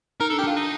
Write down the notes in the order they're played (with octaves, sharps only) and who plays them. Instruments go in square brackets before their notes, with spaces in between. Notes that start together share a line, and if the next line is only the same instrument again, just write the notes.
[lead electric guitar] D#4 [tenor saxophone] A#4
[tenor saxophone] A4
[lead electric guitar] D4
[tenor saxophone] G4
[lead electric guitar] D4 [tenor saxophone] F4
[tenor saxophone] D#4